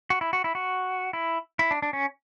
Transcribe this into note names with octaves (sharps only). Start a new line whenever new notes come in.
F#4
E4
F#4
E4
F#4
E4
E4
D4
D4
C#4